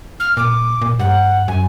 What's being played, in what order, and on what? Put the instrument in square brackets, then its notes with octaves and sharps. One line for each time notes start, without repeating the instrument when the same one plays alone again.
[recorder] F6
[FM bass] A#2 [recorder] D6
[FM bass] A#2
[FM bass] G2 [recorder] F#5
[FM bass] F#2 [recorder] G#5